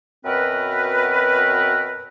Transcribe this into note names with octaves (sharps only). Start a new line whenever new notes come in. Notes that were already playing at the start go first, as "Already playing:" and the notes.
F#2 B2 C4 A#4 B4